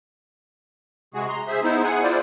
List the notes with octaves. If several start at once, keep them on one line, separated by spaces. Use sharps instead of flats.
C3 G#3 F#4 G#4
A#5 C6
G#4 C5 E5
B3 D#4 E4 C5
G#4 F#5 G#5
E4 F4 C5 D5